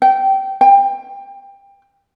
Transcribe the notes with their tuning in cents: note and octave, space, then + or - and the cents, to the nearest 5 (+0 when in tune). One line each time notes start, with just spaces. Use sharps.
G5 -20
G5 +20